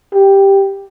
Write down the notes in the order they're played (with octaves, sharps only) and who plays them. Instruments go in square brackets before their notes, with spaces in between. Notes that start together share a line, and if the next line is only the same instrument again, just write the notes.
[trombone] G4